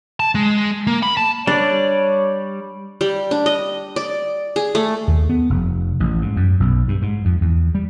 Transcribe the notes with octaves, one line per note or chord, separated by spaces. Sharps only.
A5
G#3
A#3
B5
A5
G3 D4 C#5 D5
G3
D4
D#5
D5
G#4
A3
D#2
B3
F1
A1
G#2
F#2
B1
G2
G#2
F2
E2
G3